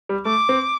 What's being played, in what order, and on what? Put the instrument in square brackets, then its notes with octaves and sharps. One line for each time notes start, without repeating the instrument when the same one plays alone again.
[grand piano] G3
[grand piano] A3 [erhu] D6
[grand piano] C4